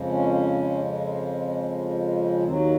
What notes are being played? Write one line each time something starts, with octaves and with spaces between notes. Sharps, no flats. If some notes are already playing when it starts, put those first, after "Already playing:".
Already playing: F2 C#3 F3 G#3
C#4
D#2 D#3 F#3 C4